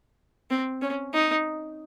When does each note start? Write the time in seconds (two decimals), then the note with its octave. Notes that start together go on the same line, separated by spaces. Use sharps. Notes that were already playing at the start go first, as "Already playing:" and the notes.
0.50 C4
0.82 C#4
1.14 D#4